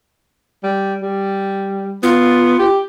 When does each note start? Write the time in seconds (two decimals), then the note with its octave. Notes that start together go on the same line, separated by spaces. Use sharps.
0.63 G3
1.02 G3
2.03 B3 F4
2.59 G4